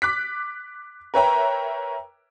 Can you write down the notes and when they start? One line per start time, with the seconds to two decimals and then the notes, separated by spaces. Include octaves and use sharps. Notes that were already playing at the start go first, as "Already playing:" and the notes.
0.02 D6 F#6 B6
1.14 A#4 B4 C#5 E5 G5 A#5